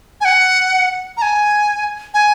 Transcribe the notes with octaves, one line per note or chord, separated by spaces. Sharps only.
G#5
F#5
A#5
G#5
G#5